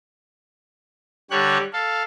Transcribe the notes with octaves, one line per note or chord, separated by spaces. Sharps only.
D3 G3 G4 C#5 F#6
A4 F5